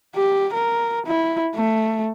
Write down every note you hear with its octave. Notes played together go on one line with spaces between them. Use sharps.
G4
A#4
E4
A3